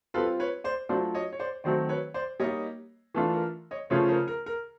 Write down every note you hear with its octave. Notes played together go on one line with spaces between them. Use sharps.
G3 C4 F4 A4 B4
B4 C#5
C5 D5
F#3 A3 D4 F4 C5 D5
C#5 D#5
C#5
C5 D5
D#3 F#3 A3 C4 C5 D5
B4 C#5
C5 D5
G3 A#3 D#4 C#5 D#5
E3 A3 D4 F4 A4
A#4
C#5 D#5
C#3 F3 A3 C#4 F4 B4 C#5
A#4 C5
A#4
A#4